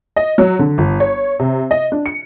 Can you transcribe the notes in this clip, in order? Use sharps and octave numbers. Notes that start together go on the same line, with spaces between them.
D#5
F#3
D3
G1
C#5
C3
D#5
D4
C#7